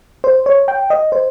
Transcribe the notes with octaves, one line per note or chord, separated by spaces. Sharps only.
C5
C#5
G5
D#5
C5